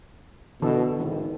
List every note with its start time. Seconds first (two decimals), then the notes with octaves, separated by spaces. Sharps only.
0.62 B2 D3 E3 A4
1.00 G#1 D#3